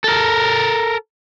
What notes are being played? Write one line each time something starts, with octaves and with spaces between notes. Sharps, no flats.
A4 A#4